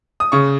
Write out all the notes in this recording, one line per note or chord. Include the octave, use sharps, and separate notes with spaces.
D#6
C#3 C#6